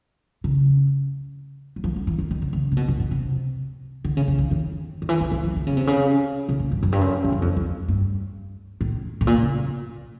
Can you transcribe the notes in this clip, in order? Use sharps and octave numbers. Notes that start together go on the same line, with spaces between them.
C#3
F#3
F3
F#3
E3
E3
D#3
D3
C#3
C3
B2
B2
A#2
C3
D3
C#3
D3
D#3
D#3
D#3
E3
D#3
E3
F3
D3
C#3
C3
C#3
C3
A2
G2
F#2
G2
F#2
G2
F#2
F2
F2
G2
A2
A2
A#2
C#3